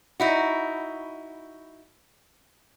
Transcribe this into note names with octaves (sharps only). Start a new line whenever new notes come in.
D#4 E4 F#4